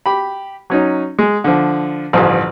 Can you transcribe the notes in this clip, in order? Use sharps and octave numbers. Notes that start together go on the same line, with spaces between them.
G4 B5
F#3 C#4 D#4
G#3
D3 F3
A1 D2 G2 F3